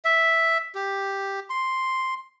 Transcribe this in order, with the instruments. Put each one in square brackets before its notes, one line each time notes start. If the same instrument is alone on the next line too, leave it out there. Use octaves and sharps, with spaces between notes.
[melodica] E5
G4
C6